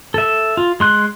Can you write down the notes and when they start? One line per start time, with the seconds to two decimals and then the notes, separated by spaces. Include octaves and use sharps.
0.14 A4 E5
0.57 F4
0.80 G#3 C6 F#6